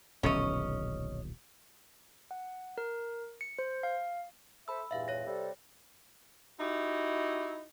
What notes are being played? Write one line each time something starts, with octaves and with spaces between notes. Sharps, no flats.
D#1 B1 D3 C#4 D#5
F#5
A#4
C#7
C5
F5
A4 C5 E5 B5 E6
E2 G2 A#2 E5 F5
C#5 A#6
C3 G3 A4
D#4 E4 F#4 G4